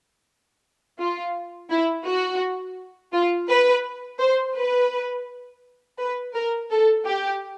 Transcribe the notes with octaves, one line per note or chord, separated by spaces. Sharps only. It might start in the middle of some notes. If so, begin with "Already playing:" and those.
F4
E4
F#4
F4
B4
C5
B4
B4
A#4
A4
G4